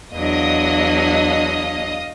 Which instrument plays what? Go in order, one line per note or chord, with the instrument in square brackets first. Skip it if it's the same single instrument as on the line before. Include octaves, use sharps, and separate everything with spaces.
[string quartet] E2 F#3 D4 [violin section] D#5 F5 D#6